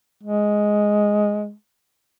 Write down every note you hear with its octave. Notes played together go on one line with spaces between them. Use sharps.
G#3